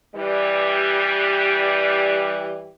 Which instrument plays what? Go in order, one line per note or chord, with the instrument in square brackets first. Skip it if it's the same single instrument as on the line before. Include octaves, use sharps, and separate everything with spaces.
[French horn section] E3 G3 G4